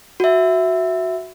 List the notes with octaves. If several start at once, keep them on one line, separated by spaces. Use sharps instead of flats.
F#4 E5